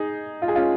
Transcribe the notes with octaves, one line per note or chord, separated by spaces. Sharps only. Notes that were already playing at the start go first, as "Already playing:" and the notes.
Already playing: D#4 G#4
F4
G#4
C#4 F4